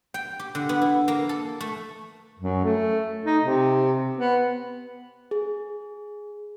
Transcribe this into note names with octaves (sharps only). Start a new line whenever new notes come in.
G5
G4
D3
B3
E4
A#3
A4
A3
F#2
A3
D#4
C3
B3
G#4